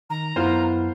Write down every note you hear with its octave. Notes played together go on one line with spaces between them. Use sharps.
D#3 A#5
F#2 B3 E4 F4 A#4 C5